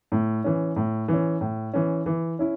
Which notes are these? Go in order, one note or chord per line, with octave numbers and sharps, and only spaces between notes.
A2
E3 C#4
A2
E3
C#4
A2
E3 C#4
E3
C#4 E4